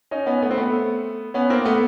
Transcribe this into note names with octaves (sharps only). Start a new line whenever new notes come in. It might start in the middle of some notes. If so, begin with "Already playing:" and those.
C#4 D#4
B3 C#4
A3 B3
C4
A3 B3
B3 C#4
A#3 C4
A3 B3